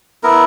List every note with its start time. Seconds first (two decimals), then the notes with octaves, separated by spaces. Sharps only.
0.23 B3 E4 A#4